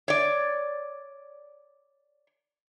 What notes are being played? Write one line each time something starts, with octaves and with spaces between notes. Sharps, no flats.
C#5 D5